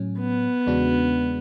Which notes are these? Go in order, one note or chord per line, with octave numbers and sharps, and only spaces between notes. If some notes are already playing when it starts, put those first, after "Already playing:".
Already playing: A2 F#3 C#4
B3
E2 C#3 G#3 D4 F#4